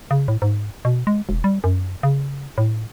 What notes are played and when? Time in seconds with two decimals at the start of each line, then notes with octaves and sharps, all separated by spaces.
0.11 C#3
0.28 A2
0.42 G#2
0.85 B2
1.07 G#3
1.29 E1
1.44 G3
1.64 F#2
2.03 C#3
2.58 A2